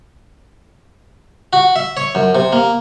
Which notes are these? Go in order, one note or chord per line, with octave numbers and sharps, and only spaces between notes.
F#4
E5
C#5
F#2
C3
A#3